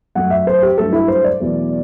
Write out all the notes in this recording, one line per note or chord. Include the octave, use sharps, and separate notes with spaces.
F#2 F#3 A3 F#5
E5
C5
G4
G2 F#3 A3 A4
E4
C5
D5
E2 B2 F#3 A3